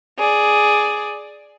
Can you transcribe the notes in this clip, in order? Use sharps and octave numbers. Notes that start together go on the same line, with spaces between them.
G#4 D5